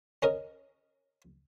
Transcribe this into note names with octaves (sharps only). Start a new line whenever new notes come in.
C#4 A#4 D#5